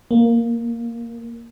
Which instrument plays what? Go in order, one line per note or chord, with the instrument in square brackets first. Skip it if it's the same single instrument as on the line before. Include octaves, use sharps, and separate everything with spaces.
[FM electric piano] A#3